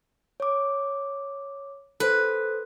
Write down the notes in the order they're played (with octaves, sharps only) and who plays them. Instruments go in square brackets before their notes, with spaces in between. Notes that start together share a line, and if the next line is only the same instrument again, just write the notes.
[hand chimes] C#5 D6
[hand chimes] A4 C5 [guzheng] B4